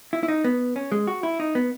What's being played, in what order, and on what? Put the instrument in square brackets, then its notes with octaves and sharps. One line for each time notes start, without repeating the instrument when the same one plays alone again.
[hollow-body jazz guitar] E4
E4
D#4
B3
C#4
G#3
F#4
E4
D#4
B3